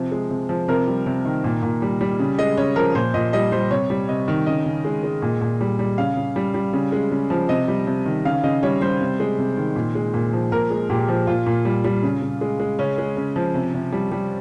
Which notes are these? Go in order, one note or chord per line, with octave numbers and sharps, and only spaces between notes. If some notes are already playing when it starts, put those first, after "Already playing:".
Already playing: C3 F3
G#3
C3
F3
C3 A#4
G3
C3
D#3
A#2
A#2
G3
G3
C#3
G#3 D#5
C#3 C#5
F3 A#4
A#2 C5
A#2 D#5
G3 D#5
G3 C5
C3 C#5
G3
C3 D#5
D#3
C#3 D#5
C#3
G#3
G#3
A#2
A#2
G3
G3
C#3 F5
C#3
G3
G3
C#3
G#3
C#3
F3
C3 D#5
G3
C3
D#3
C#3 F5
C#3 D#5
G3 C#5
G3 C5
C3
G#3
C3
D#3
A#2
G#3
A#2
F3
A#2 A#4
G#3
A#2 G4
F3
A#2 F4
A#2
G3
G3
C#3
C#3
G#3
G#3
C#3 C#4
G#3
C#3
F3
C3
C3
G3
G3